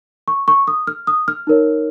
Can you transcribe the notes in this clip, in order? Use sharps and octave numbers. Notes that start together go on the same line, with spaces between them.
C#6
C#6
D#6
F6
D#6
F6
D#4 A#4 C#5